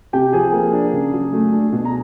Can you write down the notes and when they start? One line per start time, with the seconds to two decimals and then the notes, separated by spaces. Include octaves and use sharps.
0.13 C3 G4 G5
0.33 F3 G#4 G#5
0.53 A#3
0.73 D4
0.93 C#3
1.13 F#3
1.32 A3
1.52 D4
1.72 B2
1.85 A#5